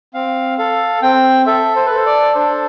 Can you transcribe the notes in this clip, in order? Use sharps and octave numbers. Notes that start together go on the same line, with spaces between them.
C4 F5
A4 F5
C4 G5
A4 E5
C5
B4
A4 C5
D5
D4 C5